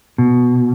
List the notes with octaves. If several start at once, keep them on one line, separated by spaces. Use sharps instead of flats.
B2